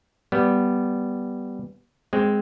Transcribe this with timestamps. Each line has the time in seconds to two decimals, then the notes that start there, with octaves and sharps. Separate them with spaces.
0.32 G3 B3
2.13 G#3 C4